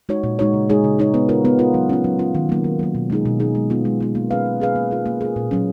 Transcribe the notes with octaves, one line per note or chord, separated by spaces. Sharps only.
G#3 D#4 F#4 C#5
A#2
G#3 D#4 F#4 C#5
C#3
G#3 D#4 G#4 C#5
C#3
G#3 D#4 G#4 C#5
B3
F4 A#4
B3
F4 A#4
F#3
C#4 F4
F#3
C#4 F4
D#3
F#3 A#3
D#3
F#3 A#3
B2
G#3 D#4 G#4
B2
G#3 D#4 G#4
G#3
B3 F4
G#3
B3 F4
A#3
C#4 G#4 B4 F5
A#3
C#4 G#4 B4 F5
A#3
F4 G#4
A#3
F4 G#4
A#2
F#3 C#4